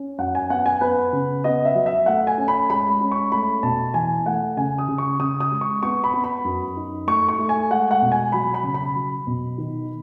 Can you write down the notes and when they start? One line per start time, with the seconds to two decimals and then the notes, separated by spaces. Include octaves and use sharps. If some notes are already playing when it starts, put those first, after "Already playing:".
Already playing: C#4
0.18 F#2 F#5
0.35 G#5
0.50 B3 F#5
0.66 G#5
0.81 B3 B4
1.13 C#3
1.44 B3 D#5
1.65 E5
1.75 F#3
1.86 E5
2.06 A3 F#5
2.27 G#5
2.38 C#4
2.48 B5
2.70 G#3 B5
2.90 B5
3.01 C#4
3.12 C#6
3.32 A3 B5
3.63 B2 A5
3.94 E3 G#5
4.26 A3 F#5
4.57 C#3 G#5
4.78 D#6
4.88 C#3
4.98 C#6
5.19 C#3 D#6
5.40 D#6
5.52 G#3
5.61 C#6
5.83 B3 C#6
6.04 B5
6.13 B3
6.24 B5
6.44 F#2
6.77 D#4
7.07 A3 C#6
7.28 C#6
7.38 A3
7.49 G#5
7.70 G#3 F#5
7.91 F#5
8.02 B2
8.12 G#5
8.32 F#3 B5
8.54 B5
8.64 C#3
8.74 B5
8.95 F#3
9.27 B2
9.58 D#3